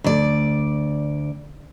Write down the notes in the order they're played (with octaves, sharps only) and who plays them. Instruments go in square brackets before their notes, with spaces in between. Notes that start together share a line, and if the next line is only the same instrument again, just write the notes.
[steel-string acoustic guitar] D2 D5